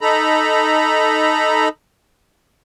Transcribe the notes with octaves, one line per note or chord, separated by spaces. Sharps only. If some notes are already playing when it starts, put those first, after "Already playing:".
D#4 A4 A#5 B5